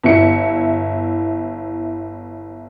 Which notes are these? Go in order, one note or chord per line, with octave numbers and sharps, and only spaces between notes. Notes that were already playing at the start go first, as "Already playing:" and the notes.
G1 E4 E5 C#7